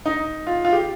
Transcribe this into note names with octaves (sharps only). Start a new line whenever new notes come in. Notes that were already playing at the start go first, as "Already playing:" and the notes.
D#4
F4
F4
G4